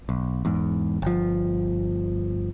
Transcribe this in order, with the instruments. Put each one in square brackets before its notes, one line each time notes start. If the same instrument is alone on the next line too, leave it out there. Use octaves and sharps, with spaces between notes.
[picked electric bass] B1
E2 G#2
G1 F3